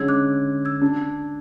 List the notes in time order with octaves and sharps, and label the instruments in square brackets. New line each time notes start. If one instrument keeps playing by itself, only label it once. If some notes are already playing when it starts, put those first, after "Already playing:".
Already playing: [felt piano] D3 G#3 C#4 [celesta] E6 G#6
[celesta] D6 F#6
E6 G#6
[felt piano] D4